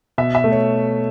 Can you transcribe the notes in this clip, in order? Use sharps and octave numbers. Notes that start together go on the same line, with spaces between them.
B2 E5
E5
A3
C#5